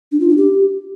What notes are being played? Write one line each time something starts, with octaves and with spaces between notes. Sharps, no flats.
D4
F4
D4
G4